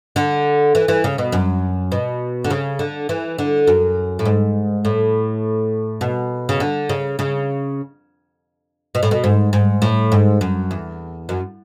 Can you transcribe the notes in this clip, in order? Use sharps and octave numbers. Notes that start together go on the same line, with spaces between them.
D3
E3
E3
C#3
B2
F#2
B2
D3
C#3
D3
E3
D3
F#2
A2
G#2
A2
B2
C#3
D3
C#3
C#3
B2
A2
B2
G#2
G#2
A2
G#2
F#2
E2
F#2